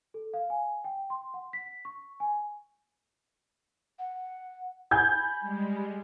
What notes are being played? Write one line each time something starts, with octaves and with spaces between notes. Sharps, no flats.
A4
F5
G#5
G5
C6
F#5
B6
C#6
G#5
F#5
G#5 B5 G6 G#6
G3 G#3